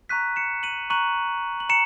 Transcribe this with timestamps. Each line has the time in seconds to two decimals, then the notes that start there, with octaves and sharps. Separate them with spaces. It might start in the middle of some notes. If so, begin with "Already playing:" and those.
0.09 A#5 C#6 F#6 B6 D#7
0.36 C#7 E7
0.63 D#7 F#7
0.90 A#5 C#6 F#6 D#7 F#7
1.60 F#7
1.69 A#5 C#7 E7